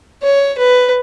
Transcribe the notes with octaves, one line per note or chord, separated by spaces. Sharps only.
C#5
B4